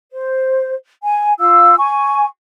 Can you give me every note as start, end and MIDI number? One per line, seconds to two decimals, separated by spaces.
0.12 0.74 72
1.04 1.33 80
1.40 1.75 65
1.40 1.75 77
1.40 1.75 88
1.78 2.25 80
1.78 2.25 85